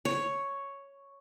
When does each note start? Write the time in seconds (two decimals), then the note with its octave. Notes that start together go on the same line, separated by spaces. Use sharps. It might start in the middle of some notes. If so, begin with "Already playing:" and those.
0.05 C#5